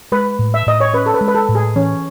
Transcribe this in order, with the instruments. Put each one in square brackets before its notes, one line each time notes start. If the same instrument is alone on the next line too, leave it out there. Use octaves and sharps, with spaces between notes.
[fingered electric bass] G#3 [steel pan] B4
[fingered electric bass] A2
[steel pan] E5
[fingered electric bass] A2 [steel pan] D#5
[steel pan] C#5
[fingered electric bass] C#4 [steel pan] B4
[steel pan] A4
B4
[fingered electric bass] G#3
[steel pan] B4
A4
[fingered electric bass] A2
[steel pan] G#4
[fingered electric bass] E3 [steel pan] C#4